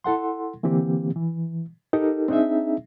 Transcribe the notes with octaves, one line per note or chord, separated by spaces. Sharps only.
E4 A4 F#5 C6
D3 E3 A#3 C4 G4
E3
D#4 G4 A4 A#4
C4 D4 D#4 G#4 E5